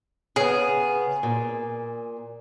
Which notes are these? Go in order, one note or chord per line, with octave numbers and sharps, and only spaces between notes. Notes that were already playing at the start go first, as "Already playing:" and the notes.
C#3 B3 G#4
A#2